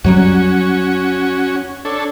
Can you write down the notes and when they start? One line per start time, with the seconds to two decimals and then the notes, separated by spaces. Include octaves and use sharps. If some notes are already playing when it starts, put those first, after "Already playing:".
0.04 F2 F#3 G3 C#4 F#4
1.85 D4 A4 C#5